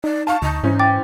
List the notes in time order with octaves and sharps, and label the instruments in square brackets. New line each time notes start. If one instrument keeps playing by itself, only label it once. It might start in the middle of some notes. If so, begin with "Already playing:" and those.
[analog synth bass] D#4 [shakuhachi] D5
[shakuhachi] F5 [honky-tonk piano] A5 C#6
[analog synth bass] D2 [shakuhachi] D#4
[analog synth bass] G#2 [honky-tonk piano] E3 C#4 C5
[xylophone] G5 D6 A6